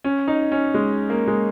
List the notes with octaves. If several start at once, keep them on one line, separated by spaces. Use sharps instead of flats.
C#4
D#4
C#4
G#3
A#3
G#3